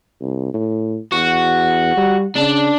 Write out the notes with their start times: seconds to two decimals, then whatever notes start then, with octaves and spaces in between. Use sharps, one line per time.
0.21 C2
0.54 A2
1.12 E2 F#4
1.97 G3
2.35 C#3 D4